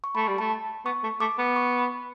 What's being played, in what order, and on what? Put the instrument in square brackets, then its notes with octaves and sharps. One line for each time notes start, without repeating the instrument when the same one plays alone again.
[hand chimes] C#6
[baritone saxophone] A3 [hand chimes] B5
[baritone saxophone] G3
[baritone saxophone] A3 [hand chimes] A5
[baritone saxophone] B3 [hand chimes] C#6
[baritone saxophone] A3
[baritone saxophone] A3 [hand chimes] D6
[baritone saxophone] B3
[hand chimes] C#6
B5